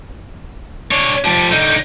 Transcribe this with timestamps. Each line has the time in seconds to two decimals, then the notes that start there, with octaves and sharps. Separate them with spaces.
0.91 D4 C#5
1.25 F3 G4 A5
1.50 D3 D#4 G6